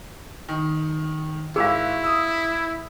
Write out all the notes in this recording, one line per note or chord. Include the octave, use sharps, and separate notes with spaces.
D#3
G#1 E4 G#4 F5 E6
D#6 E6